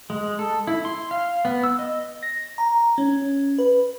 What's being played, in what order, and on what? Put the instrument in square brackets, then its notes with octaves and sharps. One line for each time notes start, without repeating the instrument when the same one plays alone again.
[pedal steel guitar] G#3
A4
E4
C6
F5
B3
E6
D#5
[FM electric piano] A#6
A#5
C#4
B4